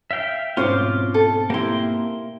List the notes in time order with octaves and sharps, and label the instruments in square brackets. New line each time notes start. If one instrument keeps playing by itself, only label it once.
[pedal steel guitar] E5 F5 G5
[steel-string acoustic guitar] G#2 B2 C4 [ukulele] C#4 C5 [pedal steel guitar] F4 D6
[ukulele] A4
[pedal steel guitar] A#3 C6 [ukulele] E4 G4